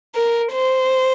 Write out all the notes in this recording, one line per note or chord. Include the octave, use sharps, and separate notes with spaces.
A#4
C5